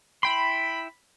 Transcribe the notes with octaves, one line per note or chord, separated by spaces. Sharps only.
E4 G5 B5 C6